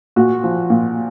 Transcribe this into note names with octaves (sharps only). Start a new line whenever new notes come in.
A#2 F#4
F3
A#2